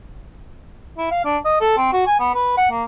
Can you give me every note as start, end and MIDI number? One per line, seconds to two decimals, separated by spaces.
0.98 1.08 64
1.11 1.20 77
1.25 1.37 62
1.45 1.59 75
1.61 1.75 69
1.77 1.91 60
1.92 2.04 66
2.06 2.18 80
2.19 2.33 59
2.34 2.54 71
2.57 2.68 78
2.71 2.84 58